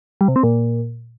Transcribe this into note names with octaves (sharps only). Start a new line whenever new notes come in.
G3
C3
C4
A#2